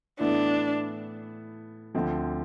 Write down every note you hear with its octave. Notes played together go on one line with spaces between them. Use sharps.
A2 E3 B3 D4 E4 A4
D2 D3 F3 C4